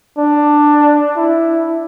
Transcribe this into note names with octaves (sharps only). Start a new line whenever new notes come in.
D4
E4